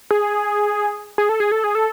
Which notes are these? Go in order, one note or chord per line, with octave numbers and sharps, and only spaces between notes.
G#4
G#4
A4
G#4
A4
G#4
A4